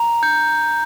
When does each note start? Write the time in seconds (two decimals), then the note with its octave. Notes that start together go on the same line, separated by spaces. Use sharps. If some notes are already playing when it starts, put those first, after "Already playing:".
Already playing: A#5
0.23 G6